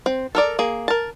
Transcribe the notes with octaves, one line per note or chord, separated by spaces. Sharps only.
C4
A4 A#4 D5
A#3 G#4
A#4 A5